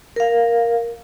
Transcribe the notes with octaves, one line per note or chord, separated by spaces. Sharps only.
A#4 F5